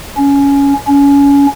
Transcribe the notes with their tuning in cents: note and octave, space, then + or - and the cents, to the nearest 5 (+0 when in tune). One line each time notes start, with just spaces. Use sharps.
C#4 +15
C#4 +25